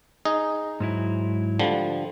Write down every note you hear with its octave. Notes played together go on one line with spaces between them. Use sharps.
D#4 G#4 D#5
G#2 F#3 E4
D3 F3 G3